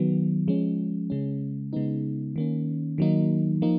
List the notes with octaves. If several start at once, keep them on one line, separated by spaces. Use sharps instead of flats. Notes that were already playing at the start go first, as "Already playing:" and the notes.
Already playing: D#3 F#3 B3
F3 G#3 C#4
C#3 G#3 C#4
C#3 G#3 B3 D#4
D#3 A#3 C#4
D#3 F#3 A#3 D#4
F3 A#3 D#4